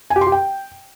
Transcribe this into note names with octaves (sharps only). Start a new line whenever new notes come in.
G#5
G4
C6
G4
G5